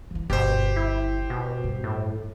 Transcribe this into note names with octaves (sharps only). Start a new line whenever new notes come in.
E3 E4
G1 B2 G4 C5
E4
B2
G2
A2